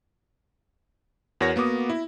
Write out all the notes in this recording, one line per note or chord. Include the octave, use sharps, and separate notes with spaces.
E2 F#4 A#4 C#5 A#6
A#3 B3 F#4 D6 D#6
E4